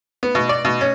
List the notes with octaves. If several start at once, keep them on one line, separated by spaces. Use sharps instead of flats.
B3
B2
D5
B2
C#4